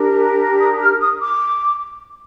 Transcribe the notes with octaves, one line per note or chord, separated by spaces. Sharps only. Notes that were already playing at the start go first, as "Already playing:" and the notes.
Already playing: D4 G4 A#4
D#6
F6
D#6
D6